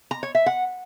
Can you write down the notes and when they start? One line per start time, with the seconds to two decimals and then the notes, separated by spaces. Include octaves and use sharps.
0.11 A#5
0.23 C#5
0.35 E5
0.46 F#5